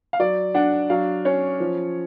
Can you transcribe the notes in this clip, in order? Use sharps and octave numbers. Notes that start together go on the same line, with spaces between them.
F5
F#3 D5
D4 F#5
F#3 F5
C#4 C#5
F3